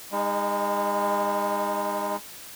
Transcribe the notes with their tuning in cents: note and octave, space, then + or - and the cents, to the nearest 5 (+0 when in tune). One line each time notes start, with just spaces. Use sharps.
G#3 -35 D#4 +0